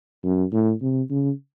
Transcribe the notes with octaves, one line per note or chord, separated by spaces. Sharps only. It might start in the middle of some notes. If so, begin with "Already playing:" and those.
F#2
A2
C3
C#3